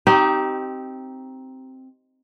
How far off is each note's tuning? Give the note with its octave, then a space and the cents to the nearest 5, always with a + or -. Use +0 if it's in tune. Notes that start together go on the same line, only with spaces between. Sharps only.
C4 +0 D#4 +0 G4 -25